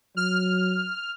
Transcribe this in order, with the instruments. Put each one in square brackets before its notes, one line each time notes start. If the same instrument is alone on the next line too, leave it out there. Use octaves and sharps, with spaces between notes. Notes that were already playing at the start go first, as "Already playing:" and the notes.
[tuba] F#3 [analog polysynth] F6